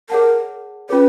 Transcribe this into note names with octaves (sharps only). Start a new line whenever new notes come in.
G#4 A#4 C#5 F#5 A5
C#4 F4 G#4 B4 C#5